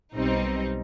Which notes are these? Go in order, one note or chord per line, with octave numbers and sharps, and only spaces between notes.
B1 B2 G3 C4 D#4